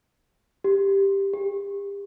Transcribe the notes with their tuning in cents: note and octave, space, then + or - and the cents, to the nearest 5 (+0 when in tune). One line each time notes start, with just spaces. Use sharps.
G4 +5
G4 +35